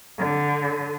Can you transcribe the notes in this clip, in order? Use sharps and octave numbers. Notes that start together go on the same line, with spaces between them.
D3